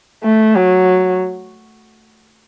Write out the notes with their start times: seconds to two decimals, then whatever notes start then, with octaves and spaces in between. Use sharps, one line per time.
0.24 A3
0.55 F#3